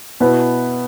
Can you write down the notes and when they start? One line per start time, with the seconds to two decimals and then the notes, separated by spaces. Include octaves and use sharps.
0.20 B2 B3 E4 B4